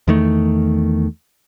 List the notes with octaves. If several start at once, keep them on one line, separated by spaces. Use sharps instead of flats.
E2 D#3 A3